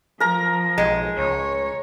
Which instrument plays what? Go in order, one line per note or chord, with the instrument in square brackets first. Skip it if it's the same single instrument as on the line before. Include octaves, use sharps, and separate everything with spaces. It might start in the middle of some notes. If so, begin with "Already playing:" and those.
[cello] F3 [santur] A#4 A#5
[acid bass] B1 [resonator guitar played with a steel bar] G#3
[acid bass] C#2 [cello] C#5